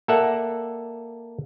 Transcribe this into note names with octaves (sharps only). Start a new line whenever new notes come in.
A#3 A4 D5 E5 F#5